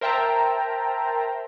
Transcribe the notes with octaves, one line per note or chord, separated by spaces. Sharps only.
A#4 C5 E5 G5 A5 A#5